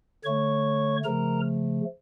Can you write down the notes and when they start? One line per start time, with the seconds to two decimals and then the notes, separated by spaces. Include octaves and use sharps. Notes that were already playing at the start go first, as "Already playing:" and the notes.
0.24 D3 A3 C#5 C#6
1.04 C#3 F3 A3 A#4 A#5